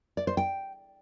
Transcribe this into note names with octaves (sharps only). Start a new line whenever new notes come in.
D5
C5
G5